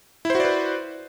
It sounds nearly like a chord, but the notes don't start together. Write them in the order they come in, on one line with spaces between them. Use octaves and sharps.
E4 C5 F#4 D5 B4